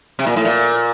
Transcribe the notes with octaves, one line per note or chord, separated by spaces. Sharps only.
C3
A#2
A2
A#2